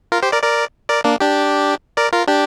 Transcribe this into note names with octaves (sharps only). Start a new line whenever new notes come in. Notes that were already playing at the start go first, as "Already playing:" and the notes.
F4 A#4
G4 C5
A#4 D5
A#4 D5
A#4 D5
A#3 D4
D4 G4
A#4 D5
F4 A#4
D4 G4